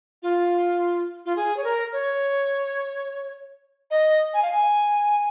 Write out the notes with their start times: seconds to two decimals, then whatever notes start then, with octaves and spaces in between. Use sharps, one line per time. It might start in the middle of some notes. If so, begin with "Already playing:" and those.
0.23 F4
1.26 F4
1.36 G#4
1.57 C#5
1.64 A#4
1.93 C#5
3.91 D#5
4.34 G#5
4.43 F5
4.51 G#5